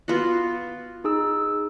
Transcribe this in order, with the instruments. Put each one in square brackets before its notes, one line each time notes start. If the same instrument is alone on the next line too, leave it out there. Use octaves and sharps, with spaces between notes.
[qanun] B3 F4 F#4
[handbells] D#4 G#4 E6